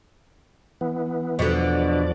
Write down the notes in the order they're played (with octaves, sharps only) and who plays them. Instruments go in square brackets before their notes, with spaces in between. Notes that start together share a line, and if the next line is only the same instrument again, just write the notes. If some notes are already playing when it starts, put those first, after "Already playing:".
[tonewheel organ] E3 B3
[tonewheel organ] E2 F3 D5 [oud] B2 D3